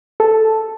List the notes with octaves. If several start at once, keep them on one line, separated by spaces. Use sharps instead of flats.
A4